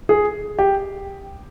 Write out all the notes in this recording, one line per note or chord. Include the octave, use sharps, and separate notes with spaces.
G#4
G4